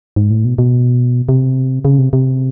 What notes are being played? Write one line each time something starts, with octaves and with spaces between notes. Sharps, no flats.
G#2
A2
B2
B2
C3
C#3
C3
C3